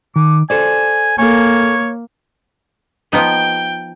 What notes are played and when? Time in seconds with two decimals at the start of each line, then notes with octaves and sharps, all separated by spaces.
0.16 D#3 D6
0.50 A4 C5 D5 G#5
1.19 A#3 A4 C#5 G#5
3.13 F3 B3 D#4 G5